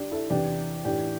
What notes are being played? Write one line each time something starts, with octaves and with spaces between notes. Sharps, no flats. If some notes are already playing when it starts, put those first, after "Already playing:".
Already playing: G2 D3 D4 G4
E4 A4
E2 C3 E3 D4 G4
A2 E3 D4 G4